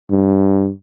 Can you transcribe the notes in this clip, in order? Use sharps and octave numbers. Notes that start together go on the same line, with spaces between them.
G2